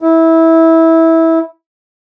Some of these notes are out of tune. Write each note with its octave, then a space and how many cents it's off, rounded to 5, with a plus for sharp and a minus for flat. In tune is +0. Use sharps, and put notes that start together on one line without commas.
E4 -15